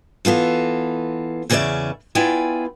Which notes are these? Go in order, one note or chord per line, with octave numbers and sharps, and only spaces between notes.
E3 B3 F4 A4
E2 C#3 C#4 B4 D5 E5
B3 E4 F4 D5 G5 G#5